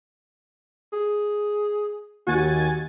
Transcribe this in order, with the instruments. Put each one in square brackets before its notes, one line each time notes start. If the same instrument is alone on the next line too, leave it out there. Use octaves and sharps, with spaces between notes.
[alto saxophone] G#4
[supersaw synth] D#2 G#5 A6 [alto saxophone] F#4